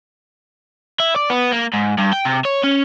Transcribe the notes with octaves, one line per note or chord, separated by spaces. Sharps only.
E4
D5
B3
A#3
G#2
G2
G5
C3
C#5
C#4